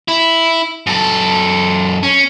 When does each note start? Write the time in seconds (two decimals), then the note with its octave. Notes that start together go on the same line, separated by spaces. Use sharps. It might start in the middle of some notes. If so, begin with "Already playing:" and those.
0.08 E4
0.87 F#2 A4
2.03 C#4